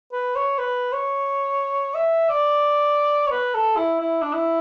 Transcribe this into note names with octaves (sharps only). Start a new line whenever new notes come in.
B4
C#5
B4
C#5
E5
D5
C#5
B4
A4
E4
E4
D4
E4